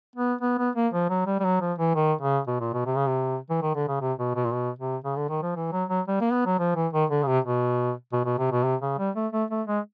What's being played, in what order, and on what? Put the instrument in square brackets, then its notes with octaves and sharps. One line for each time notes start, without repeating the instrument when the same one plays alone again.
[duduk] B3
B3
B3
A#3
F3
F#3
G3
G3
F#3
F3
E3
D#3
C#3
B2
A#2
B2
C3
C#3
C3
E3
D#3
D3
C#3
C3
B2
B2
A#2
B2
C3
C#3
D3
D#3
F3
E3
F#3
F#3
G3
A#3
B3
F#3
F3
E3
D#3
D3
C#3
C3
B2
B2
B2
C3
B2
C3
C#3
G3
A3
A3
A3
G#3